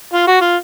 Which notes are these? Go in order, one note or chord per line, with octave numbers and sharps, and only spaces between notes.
F4
F#4
F4